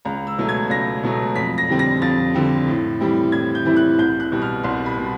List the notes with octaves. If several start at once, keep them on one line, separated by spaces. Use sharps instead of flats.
C#2 A#5
E6
B2 F#3 A3
G#6
C#2 A#6
B2 F#3 A3
F2 B6
A#6
D3 G3 C4
A#6
F2 A6
D3 G3 C4
A2
E3 G3 C4 E4
A2 G#6
G6
E3 G3 C4 E4
F#6
C2 G6
F#6
B2 G3
F6
C2 C6
B5
B2 G3